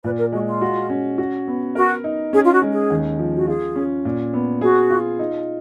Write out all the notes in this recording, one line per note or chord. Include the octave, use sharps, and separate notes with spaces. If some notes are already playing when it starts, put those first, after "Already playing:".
A#2 B4
A#4
G#3 F#4
F4
F#4
C#4
F#4
B3
F#4 A#4
D#4
C#4 G#4
F4
F#4
G#3
G#4
D#2
F3
F#4
F4 G#4
C#4
A#2
B3
F#4 G#4
F4
D#4